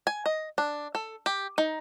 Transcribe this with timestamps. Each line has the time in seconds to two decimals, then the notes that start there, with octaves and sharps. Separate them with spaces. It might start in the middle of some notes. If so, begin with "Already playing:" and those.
0.07 G#5
0.26 D#5
0.58 D4
0.95 A4
1.26 G4
1.58 D#4